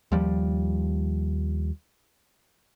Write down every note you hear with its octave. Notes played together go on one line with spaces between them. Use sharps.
D#2 F3 G3